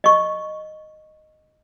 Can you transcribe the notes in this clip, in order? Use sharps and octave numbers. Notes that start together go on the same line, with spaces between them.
D#5 C#6